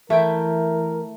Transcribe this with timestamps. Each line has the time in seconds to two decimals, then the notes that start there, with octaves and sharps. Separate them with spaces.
0.10 E3 A3 E4 A#4 G5